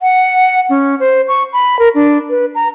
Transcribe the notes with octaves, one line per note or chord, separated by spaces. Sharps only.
F#5
C#4
C5
C#6
B5
A#4
D4
B4
A#5